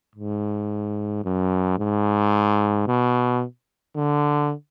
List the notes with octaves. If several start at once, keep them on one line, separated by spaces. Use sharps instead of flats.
G#2
F#2
G#2
B2
D3